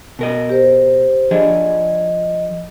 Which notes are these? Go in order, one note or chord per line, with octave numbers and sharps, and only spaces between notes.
B2 A#4 D#5
G4 C5
F3 D4 G#4 D#5